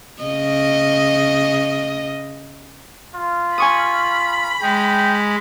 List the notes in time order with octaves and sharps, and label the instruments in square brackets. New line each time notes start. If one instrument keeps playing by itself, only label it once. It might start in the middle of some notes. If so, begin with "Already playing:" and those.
[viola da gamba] C#3 D#5
[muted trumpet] F4
[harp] G#5 C#6 D#6 [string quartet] B5
[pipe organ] G#3 [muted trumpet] G5